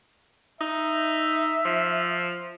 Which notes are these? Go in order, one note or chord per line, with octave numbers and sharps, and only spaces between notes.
D#4 E5
F3